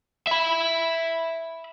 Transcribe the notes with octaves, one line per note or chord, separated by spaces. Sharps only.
E5 B5